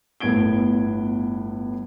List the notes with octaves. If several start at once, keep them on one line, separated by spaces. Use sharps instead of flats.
G1 A2 B3 G#6 D7 G7